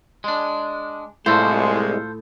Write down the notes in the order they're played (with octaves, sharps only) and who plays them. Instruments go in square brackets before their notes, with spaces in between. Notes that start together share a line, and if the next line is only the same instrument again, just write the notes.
[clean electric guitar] G#3 D4
[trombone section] C2 G#3 [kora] A2 [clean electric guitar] F4 A4 C5